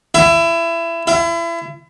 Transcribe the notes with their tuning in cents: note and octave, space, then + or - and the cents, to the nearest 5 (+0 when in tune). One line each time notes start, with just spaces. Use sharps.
E4 +25
E4 +35